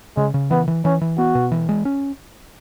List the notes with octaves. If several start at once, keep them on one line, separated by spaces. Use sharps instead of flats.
C#3 G#3
C#3
E3 B3
E3
E3 C#4
E3
B3 F#4
B2
E3
G#3
C#4